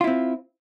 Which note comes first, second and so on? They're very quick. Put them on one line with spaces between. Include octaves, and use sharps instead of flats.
F4 E4 C4